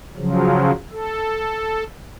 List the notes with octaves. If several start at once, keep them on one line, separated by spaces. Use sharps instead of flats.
C#3 F3 F#3
A4